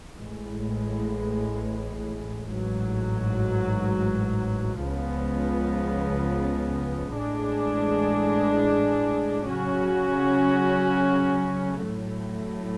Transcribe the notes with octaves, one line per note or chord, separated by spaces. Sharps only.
A1 A2 G#3
A1 G#2 F#3
C#2 C#3 F3 G#3 B3
A1 A2 G#3 D4 G#4
C#3 F#3 C#4 F#4
A2 F#3 A3